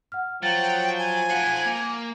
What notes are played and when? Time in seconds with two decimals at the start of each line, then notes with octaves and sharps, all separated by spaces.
0.12 F#5 F6
0.43 F3 F#3 G5 A6
0.98 G#5
1.30 C5 F#5
1.66 A#3